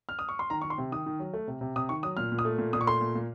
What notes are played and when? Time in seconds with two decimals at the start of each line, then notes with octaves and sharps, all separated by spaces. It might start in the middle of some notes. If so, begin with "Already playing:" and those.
0.09 F6
0.19 D#6
0.29 C#6
0.39 C6
0.50 D#3 A#5
0.62 D#3 C#6
0.70 C6
0.78 C3
0.92 D#3 D#6
1.06 D#3
1.19 F#3
1.34 A3
1.48 C3
1.61 C3
1.76 C3 D#6
1.89 D#3 C#6
2.03 F#3 D#6
2.17 A#2 F6
2.32 A#2
2.39 D#6
2.45 A3
2.59 A#2
2.73 A#2 D#6
2.81 C#6
2.87 A3 C6
3.01 A#2
3.15 A#2